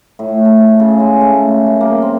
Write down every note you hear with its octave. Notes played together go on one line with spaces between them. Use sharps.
A2
A4
C#5
C#3
G#3
A3
F#2
A#3
C4